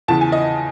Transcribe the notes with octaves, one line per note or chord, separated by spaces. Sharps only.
E2 C#3 E3 A5
G#5
D#5